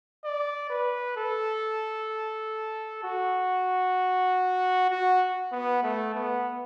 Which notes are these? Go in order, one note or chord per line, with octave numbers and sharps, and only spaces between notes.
D5
B4
A4
F#4
F#4
B3
A3
B3